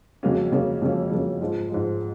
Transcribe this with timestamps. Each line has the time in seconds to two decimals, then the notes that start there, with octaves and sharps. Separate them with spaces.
0.23 F2 C#3 F#3 A#3 C#4
0.52 F2 C#3 F#3 A#3 C#4
0.82 F2 C#3 F#3 A#3 C#4
1.11 F2 C#3 F#3 A#3 C#4
1.41 G#2 F3 G#3
1.70 G#2 F3 G#3